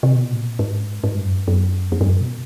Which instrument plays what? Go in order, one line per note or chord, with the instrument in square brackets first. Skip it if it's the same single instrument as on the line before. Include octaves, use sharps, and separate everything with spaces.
[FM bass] C3
B2
A2
A#2
G#2
G#2
G2
F#2
G2
F#2
F2
G2
F#2
B2